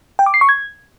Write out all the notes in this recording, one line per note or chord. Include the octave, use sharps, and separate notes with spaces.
G5
D6
C7
C#6
G#6